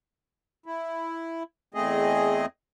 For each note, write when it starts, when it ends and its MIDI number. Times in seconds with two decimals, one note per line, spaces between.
0.66 1.43 64
1.74 2.46 40
1.74 2.46 57
1.74 2.46 60
1.74 2.46 68
1.74 2.46 75